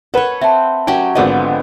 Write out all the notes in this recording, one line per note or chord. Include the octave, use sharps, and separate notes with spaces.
A4 B4 C#5 F#5
C4 E5 A5
F#3 C#4 G4 G5
G#1 D3 F3 B3 D5 D#5